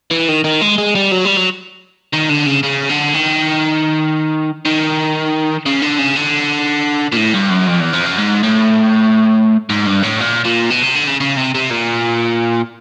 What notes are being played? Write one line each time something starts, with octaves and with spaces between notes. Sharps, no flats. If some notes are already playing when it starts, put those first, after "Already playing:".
E3
D#3
D#3
G#3
G#3
G3
F#3
G3
F#3
D#3
D3
C#3
C#3
D3
D#3
D#3
C#3
D3
C#3
D3
A#2
A2
G2
F#2
F2
E2
F2
F#2
G#2
A2
G#2
G2
A2
A#2
A#2
B2
C3
D3
C#3
C#3
C3
C3
A#2